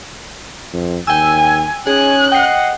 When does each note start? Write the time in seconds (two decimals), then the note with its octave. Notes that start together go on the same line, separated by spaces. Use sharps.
0.73 F2
1.07 D#2 G5 G#5 E6
1.87 C#4 D#4 G#4 G#5 F#6
2.32 D#5 F#5 G5 C7